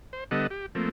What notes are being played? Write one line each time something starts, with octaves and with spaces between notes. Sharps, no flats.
C5
D3 G3 B3 A4 D#5 F#5
G4
F3 A3 A#3 C4